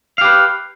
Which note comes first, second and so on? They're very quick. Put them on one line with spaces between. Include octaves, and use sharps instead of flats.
F5 G4 B4